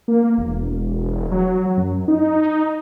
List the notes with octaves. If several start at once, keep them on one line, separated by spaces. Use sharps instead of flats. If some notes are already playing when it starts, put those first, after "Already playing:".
A#3
E1
F#3
F#2
D#4